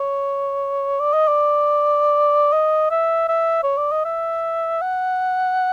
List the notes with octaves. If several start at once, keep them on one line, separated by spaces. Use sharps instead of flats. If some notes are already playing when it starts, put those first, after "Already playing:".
Already playing: C#5
D5
D#5
D5
D#5
E5
E5
C#5
D5
D#5
E5
F#5